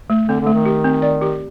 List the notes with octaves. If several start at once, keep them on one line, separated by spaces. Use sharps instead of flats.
A3
D3 C4
D3
A3
D#3
G4
C4
D5
G4